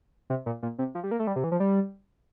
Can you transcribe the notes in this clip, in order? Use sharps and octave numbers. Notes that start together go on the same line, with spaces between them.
C3
A#2
A#2
C3
F3
G3
A#3
A3
G3
C3
E3
F3
G3